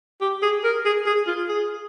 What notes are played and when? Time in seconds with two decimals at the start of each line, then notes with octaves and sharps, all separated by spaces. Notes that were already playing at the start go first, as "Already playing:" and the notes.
0.21 G4
0.43 G#4
0.64 A#4
0.85 G#4
1.06 G#4
1.27 F4
1.49 G#4